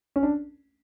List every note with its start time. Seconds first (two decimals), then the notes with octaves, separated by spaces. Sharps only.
0.16 C#4
0.23 D4